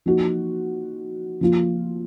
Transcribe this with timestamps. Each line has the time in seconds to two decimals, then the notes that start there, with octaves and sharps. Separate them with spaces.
0.06 F3 A#3 D#4 F#4
1.41 F3 A#3 F4